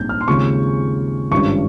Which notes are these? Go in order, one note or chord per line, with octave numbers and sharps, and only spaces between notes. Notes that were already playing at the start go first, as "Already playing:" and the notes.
Already playing: A#1 G#2 G3 C4 D#4 G6
F6
C6
D#2 C#3 G#3 C4 F4 C#6
G#1 G2 G3 C#4 F4 C#6